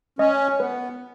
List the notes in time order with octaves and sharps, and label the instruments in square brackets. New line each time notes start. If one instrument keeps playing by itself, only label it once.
[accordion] C#4 [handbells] D#5
[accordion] B3 [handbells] B4